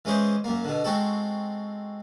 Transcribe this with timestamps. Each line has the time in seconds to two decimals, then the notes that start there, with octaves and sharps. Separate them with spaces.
0.05 E3 G#3 C#4 G#4 C5
0.44 F#2 A#3
0.65 B2 D3
0.84 G#3 C4 F#4 A4